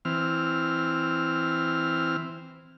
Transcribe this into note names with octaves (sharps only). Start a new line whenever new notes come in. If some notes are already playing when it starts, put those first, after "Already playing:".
E3 C4 F6